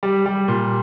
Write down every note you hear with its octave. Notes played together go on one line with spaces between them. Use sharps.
G3
G3
A#2